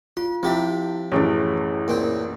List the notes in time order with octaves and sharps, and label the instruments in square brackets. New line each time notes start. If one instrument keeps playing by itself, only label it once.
[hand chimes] F4 [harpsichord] C6
[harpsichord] F3 G4 E5 [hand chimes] C4 E4
[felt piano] A1 F#2 E3 [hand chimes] E4 G#4 C#5
[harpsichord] A#2 C4 G5